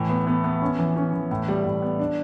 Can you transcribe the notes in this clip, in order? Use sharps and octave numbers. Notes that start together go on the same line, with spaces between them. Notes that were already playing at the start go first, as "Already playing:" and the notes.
Already playing: A2 E3
B3
B3
B3
C#4
E3
C#4
E3
A2
G3
A2
B3
D4